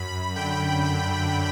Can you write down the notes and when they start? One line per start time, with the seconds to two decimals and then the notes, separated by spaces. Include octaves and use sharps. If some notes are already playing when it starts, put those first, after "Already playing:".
Already playing: F#2 B5
0.36 D3 G5
0.83 D3
1.31 D3